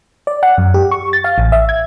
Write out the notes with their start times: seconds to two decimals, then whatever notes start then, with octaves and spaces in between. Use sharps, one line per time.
0.27 D5
0.43 F#5
0.58 F#2
0.74 G4
0.91 C#6
1.13 A6
1.24 F5
1.38 A1
1.52 E5
1.69 G#6